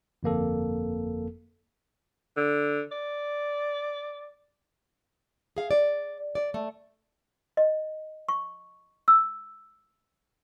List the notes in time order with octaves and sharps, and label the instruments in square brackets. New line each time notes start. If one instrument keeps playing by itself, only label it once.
[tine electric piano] G1 F2 A#3 A4
[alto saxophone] D3
D5
[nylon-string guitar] G#4 F5
D5
D5
A3
[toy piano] D#5
C#6
E6